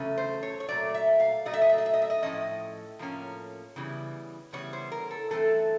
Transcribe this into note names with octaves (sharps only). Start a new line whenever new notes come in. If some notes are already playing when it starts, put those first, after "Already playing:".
Already playing: E2 C#3 F#3 A3 C#4
C5
C#5
C#5
A#2 F#3 A3 D5
E5
F5
A#2 F#3 A3 D#5
E5
D#5
E5
D#5
E5
D#5
E5
D#5
A2 F3 A#3 C#4 D#5
A2 F3 A#3 C#4
C#3 E3 G3 B3
C#3 E3 G3 B3 C#5
C5
A#4
A4
G2 E3 A3 C4 A4